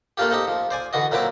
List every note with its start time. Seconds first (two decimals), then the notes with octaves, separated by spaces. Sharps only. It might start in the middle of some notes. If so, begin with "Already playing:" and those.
0.17 A3 A#3 D4 F4 G4
0.31 A3 C4 D#4 G4
0.48 F3
0.71 C5 D5 G#5
0.93 D3 E3 F#4 D#5
1.12 A#2 F#3 C4 E4 B4 D6